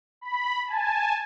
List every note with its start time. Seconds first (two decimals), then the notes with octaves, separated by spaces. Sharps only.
0.21 B5
0.66 G#5 A5